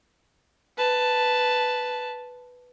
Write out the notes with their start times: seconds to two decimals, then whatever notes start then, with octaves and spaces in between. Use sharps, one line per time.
0.77 B4 A5